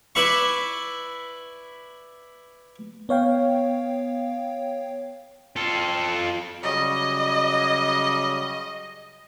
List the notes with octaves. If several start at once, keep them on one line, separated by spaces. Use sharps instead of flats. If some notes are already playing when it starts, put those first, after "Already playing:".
E4 B4 D5 E5 B5 C#6
B3 C#5 F5 G5
F4 A4
C#3 F#3 G3 D#5